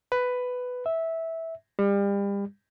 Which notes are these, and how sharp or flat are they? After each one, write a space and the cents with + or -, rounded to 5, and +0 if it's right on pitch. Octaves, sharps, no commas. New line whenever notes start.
B4 +10
E5 -10
G3 +35